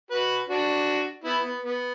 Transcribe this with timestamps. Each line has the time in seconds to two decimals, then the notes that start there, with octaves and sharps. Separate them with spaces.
0.11 F#4 B4
0.49 D4 F#4
1.24 B3 E4
1.44 B3
1.63 B3